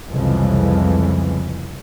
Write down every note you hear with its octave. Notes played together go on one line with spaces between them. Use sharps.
C2 F2 C#3 E3 F3 G#3